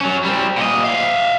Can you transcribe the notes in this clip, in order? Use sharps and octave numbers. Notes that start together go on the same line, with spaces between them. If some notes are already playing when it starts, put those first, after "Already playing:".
F#3 C#4
G3 C4
A#2 D#5
E5 F5